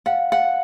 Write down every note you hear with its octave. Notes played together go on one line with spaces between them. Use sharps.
F5 F#5
F5 F#5